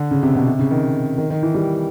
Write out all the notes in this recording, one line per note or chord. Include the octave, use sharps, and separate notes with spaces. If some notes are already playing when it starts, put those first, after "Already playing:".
Already playing: D3
C#3
C3
B2
C3
C#3
D#3
D#3
D#3
E3
G3